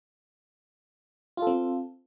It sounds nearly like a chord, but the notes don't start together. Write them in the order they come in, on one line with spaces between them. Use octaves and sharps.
F4 A4 C4